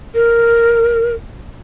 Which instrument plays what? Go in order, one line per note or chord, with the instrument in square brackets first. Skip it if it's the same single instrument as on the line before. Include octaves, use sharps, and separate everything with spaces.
[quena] A#4